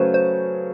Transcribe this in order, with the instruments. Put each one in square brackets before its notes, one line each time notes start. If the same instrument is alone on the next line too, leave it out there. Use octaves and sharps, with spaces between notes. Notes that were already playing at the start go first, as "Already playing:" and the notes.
Already playing: [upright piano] C#3 F#3 A3 C#4 [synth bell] B4 C5
[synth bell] C5